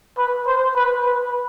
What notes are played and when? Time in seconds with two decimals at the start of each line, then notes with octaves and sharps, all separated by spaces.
0.18 B4
0.47 C5
0.76 B4
1.06 B4